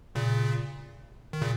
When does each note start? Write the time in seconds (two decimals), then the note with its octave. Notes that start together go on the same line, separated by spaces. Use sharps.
0.15 A#2 C#3
1.33 D#3
1.42 A#2 C#3